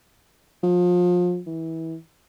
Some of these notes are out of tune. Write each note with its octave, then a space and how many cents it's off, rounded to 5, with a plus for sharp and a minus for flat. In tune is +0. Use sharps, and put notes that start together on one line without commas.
F3 +30
E3 -25